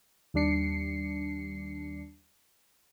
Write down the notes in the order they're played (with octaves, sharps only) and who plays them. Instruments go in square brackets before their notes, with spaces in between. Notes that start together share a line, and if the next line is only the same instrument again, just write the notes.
[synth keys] D#2 G3 D4 C7 C#7